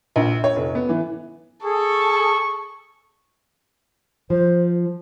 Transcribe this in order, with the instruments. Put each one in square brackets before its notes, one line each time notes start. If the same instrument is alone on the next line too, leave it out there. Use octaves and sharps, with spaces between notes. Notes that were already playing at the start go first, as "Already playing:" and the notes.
[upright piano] A#1
C#5
F1
B3
E3
[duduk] G#4 [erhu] A4 [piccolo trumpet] C#6
[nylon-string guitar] F3 [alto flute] C5